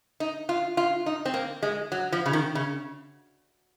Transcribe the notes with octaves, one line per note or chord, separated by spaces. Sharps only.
D#4
F4
F4
D#4
C4
A#3
G#3
F#3
F3
C#3
D#3
C#3